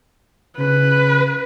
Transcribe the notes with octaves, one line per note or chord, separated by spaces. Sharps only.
C#3 B4